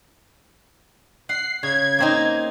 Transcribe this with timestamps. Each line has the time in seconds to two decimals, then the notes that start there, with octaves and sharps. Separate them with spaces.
1.29 F#5 C7
1.63 C#3 G#6
1.98 A#3 C4 D#4